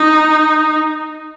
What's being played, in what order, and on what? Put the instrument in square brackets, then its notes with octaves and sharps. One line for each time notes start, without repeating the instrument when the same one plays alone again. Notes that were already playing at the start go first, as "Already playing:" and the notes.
Already playing: [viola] D#4